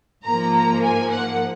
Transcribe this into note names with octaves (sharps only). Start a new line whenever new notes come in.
G#2 F3 A#3 A#5
A#5
G#5
F#5